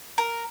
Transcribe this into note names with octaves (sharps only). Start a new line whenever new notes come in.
A#4